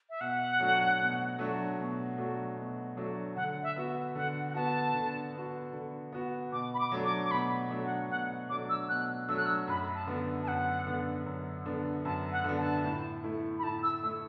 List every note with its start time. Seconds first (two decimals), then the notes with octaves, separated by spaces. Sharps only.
0.10 E5
0.21 B2 F#5
0.60 F#3 A3 D4 F#4
1.00 B2
1.39 F#3 A3 D4 F#4
1.78 B2
2.18 F#3 A3 D4 F#4
2.57 B2
2.97 F#3 A3 D4 F#4
3.36 D3 F#5
3.62 E5
3.76 B3 F#4
4.15 D3 F#5
4.49 F#5
4.55 B3 F#4 A5
4.94 D3
5.34 B3 F#4
5.73 D3
6.12 B3 F#4
6.52 B2 D6
6.74 B5
6.79 D6
6.92 F#3 A3 D4
7.05 D6
7.25 D6
7.31 B2 B5
7.70 F#3 A3 D4
7.85 F#5
8.10 B2 F#5
8.49 F#3 A3 D4 D6
8.69 E6
8.89 B2 F#6
9.29 F#3 A3 D4 E6
9.37 F#6
9.46 E6
9.68 F#2 B5
9.95 A5
10.07 D3 B3 D4
10.43 A5
10.47 F#2 F#5
10.87 D3 B3 D4
11.26 F#2
11.66 D3 B3 D4
12.05 F#2 A5
12.32 F#5
12.44 D3 B3 D4
12.58 A5
12.84 A2
13.24 A3 E4
13.59 B5
13.63 A2 A5
13.83 E6
14.03 A3 E6
14.06 E4